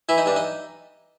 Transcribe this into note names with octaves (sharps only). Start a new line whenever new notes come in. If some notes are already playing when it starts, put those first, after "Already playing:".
E3 E4
D#4
G2 D4
D#4